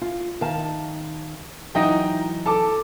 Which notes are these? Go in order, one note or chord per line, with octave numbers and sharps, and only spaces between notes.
F4
D#3 F5 A5
E3 F#3 D#4 D#5 G5
A4 A5 D6